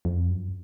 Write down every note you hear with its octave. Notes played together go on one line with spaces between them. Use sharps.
F2
F#2